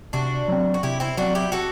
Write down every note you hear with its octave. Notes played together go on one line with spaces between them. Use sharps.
C3 D4 F#4
F#3 C4
F#4
C3 E4 G4
C4 E4
F#3 C4 D4 F#4
E4 G4
F#4 A4